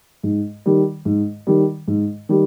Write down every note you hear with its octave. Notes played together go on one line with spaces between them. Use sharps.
G#2
D#3 G3
G#2
D#3 G3
G#2
D#3 G3